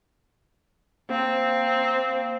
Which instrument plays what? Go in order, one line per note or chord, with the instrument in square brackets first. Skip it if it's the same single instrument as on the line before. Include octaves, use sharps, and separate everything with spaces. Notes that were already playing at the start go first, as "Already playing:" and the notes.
[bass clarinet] A#3 [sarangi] C4